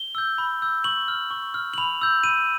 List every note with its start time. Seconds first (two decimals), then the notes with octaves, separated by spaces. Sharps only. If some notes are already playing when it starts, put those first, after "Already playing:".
Already playing: G7
0.15 E6 G6
0.38 B5
0.62 E6 G6
0.84 C#6 F#7
1.08 F6
1.31 C#6
1.54 F6
1.74 F#7
1.78 B5 F7
2.01 E6 G6
2.24 B5 D#7